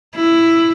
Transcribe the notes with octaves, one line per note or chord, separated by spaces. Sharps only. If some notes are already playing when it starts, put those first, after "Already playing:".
E4